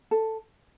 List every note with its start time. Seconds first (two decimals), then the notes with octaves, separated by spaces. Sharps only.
0.11 A4